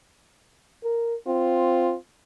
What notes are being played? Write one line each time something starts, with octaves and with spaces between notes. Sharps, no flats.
A#4
C4 F4